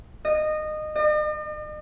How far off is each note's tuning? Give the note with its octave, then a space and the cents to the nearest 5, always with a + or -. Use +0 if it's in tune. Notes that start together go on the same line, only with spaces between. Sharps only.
D#5 -20
D#5 -45